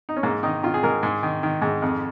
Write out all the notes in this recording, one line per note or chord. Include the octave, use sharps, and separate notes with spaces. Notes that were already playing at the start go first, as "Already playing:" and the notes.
D#4
C#4
G#2 A#3
D#3 D#4
D#3 F4
G#4
G#2 A#4
G#2 G#4
D#3
D#3
G#2
F2